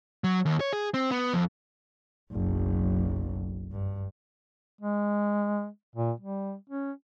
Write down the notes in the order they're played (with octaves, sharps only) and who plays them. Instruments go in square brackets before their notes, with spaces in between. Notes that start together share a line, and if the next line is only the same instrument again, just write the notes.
[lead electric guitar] F#3
D#2
C#5
G#4
C4
B3
F2
[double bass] F#1 B1
G2
[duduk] G#3
A#2
G3
C#4